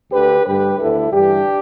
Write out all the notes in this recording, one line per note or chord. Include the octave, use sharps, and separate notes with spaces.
D2 D3 G4 B4
G2 D3 G4 B4
D2 D3 E4 A4
G2 E3 D4 G4